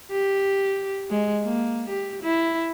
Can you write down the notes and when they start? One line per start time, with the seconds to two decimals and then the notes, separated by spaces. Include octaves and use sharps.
0.11 G4
1.10 G#3
1.44 A#3
1.89 G4
2.23 E4